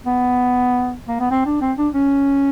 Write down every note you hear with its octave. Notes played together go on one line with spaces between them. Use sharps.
B3
A#3
B3
C4
D4
C4
D4
C#4